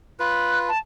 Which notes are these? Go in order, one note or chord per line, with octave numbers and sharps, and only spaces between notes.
F4 B4 F#6
A5